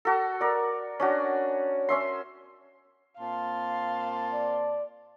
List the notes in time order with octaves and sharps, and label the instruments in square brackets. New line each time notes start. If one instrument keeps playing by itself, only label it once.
[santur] F#4 A4
A#4 D5
C#4 D4 F#4
C#4 E5 C6
[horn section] A#2 C4 A5 [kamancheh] F5 C6
[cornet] D5